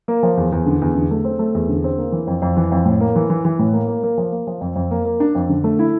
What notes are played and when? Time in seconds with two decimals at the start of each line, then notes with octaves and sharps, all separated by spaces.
0.08 A#3
0.23 F3
0.37 E2
0.52 E2
0.66 D3
0.82 E2
0.96 D3
1.11 A3
1.24 C4
1.39 A3
1.55 E2
1.69 D3
1.84 C4
1.98 A#3
2.12 E3
2.27 F2
2.42 F2
2.57 E3
2.72 F2
2.85 A2
3.00 A#3
3.16 E3
3.30 E3
3.45 E3
3.59 A2
3.73 A#3
3.88 A#3
4.03 A#3
4.18 F3
4.32 A#3
4.47 F3
4.61 F2
4.76 F2
4.91 A#3
5.05 A#3
5.20 D4
5.35 F2
5.49 D3
5.64 A3
5.79 E4